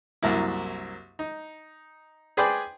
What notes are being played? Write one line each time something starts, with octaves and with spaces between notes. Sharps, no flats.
C2 F#2 A#3 E4
D#4
G#4 B4 C5 D5 G5 G#5